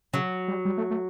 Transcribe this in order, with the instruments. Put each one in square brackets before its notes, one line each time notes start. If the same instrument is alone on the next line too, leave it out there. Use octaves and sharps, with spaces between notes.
[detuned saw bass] C#3 [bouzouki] F#3
[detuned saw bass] G3
G3
A3
A3